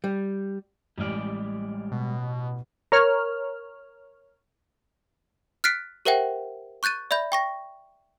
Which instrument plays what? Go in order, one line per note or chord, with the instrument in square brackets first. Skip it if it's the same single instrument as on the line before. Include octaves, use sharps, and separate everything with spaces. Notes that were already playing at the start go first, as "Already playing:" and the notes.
[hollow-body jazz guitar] G3
[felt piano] A1 F6 [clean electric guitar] G3 G#3 D5
[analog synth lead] B2
[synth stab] A#4 C#5 F6
[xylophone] F6 F#6 A6 B6 C7 D7
G4 A#4 C5 E5 F#5 G5
C#6 F#6 G6 A6 D#7
D5 E5 B5 G6
G5 C#6 A#6